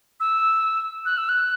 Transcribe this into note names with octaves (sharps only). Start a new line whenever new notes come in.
E6
F#6
E6
F#6